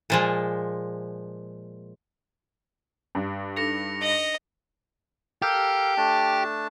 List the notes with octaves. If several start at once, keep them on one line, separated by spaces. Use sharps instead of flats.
A#2 F3 G#3
G2
D4 D#4 A4 A#6 C#7 F7
D#5
G4 A4 A#4 F5
A3 D4 A5